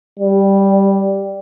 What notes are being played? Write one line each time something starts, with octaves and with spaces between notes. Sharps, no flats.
G3